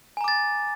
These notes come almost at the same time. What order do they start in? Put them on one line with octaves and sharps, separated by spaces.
G#5 A#5 D6 A6